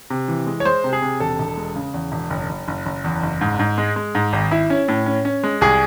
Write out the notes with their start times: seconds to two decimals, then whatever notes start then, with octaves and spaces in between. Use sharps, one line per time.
0.10 C3
0.28 E3
0.47 G#3
0.60 C#5
0.65 G#3 C5
0.84 C3
0.93 G#4
1.02 C3
1.20 E1 A4
1.39 E1
1.57 G#3
1.76 C#3
1.94 E2
2.12 E1
2.30 F#1
2.49 F#1
2.68 F#1
2.86 F#1
3.04 E2
3.23 F#1
3.41 G#2
3.59 G#2
3.78 G#3
3.96 G#3
4.15 G#2
4.33 G#1
4.51 E4
4.70 C#4
4.88 A2
5.06 C#4
5.25 C#4
5.43 G#3
5.61 C2 G#4